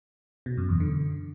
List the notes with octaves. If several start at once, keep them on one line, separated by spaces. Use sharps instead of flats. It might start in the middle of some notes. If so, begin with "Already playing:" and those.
B2
F#2
E2
D3